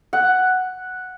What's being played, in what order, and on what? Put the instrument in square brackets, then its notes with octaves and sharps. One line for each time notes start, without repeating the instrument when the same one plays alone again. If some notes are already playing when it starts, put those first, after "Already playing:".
[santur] F#5